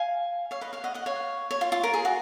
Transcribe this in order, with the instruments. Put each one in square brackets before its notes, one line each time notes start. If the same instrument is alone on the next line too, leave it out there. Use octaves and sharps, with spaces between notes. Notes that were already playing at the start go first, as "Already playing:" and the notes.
Already playing: [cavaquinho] F5 G#5
C#5 F5
B4 D#5
C#5 F5
D#5 F#5
D#5 F#5
C#5 F5
C#5
F4
F4
A#4
G#4
F#4